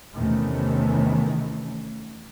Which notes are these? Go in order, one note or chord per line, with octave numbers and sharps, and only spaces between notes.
E2 C3 D#3 E3 A3 C#4